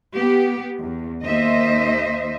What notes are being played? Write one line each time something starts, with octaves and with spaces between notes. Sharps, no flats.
B3 G4
E2
D#2 A#3 C5 D#5 E5